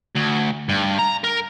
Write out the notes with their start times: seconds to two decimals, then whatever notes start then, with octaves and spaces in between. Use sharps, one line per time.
0.15 D2
0.69 G2
0.99 A#5
1.24 A#4